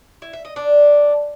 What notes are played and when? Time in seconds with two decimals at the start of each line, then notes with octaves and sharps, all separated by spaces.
0.22 E4
0.33 E5
0.45 D#5
0.56 D4